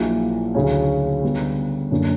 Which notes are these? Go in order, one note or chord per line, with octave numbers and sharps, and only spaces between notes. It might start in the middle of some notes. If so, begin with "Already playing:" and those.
Already playing: A#1 A#2 F#3 A#3 E4
D2 C#3 F#3 C#4
D2 C#3 G3 B3
F#2 D3 A#3 D4